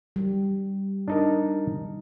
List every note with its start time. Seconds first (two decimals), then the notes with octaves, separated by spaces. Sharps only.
0.16 G3
1.08 D4 D#4 A#4